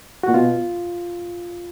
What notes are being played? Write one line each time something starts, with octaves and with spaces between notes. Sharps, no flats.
A#2 F#4
B2 F4